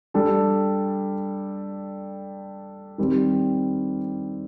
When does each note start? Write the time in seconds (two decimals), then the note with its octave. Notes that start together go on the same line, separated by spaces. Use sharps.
0.14 G3 D4 A4
2.98 D#3 G3 C4 G4